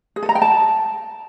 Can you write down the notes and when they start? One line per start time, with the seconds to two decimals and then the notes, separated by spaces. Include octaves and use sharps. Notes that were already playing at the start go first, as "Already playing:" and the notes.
0.16 G#4
0.23 A4
0.29 A#5
0.35 G5
0.42 A5